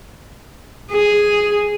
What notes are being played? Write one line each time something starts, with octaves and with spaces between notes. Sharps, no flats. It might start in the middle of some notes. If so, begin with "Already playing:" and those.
G#4